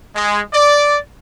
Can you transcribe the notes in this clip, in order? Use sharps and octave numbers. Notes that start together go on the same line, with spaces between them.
G#3
D5